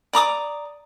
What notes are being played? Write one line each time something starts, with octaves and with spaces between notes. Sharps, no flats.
D5 A#5 D6 D#6